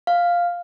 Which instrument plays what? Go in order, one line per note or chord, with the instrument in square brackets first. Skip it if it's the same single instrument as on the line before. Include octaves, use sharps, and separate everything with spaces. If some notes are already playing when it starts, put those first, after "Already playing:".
[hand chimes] F5